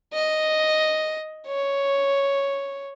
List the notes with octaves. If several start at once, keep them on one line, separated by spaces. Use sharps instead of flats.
D#5
C#5